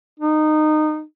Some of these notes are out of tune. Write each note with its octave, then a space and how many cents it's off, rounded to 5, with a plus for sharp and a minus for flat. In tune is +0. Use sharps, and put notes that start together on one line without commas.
D#4 -20